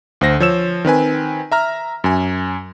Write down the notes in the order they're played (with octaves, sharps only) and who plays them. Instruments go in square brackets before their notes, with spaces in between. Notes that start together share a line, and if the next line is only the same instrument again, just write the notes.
[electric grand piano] D2 C5 A#6
F3 C#5 E6 E7
D#3 C4 B4 G#5
E5 A#5 F6
F#2 G#5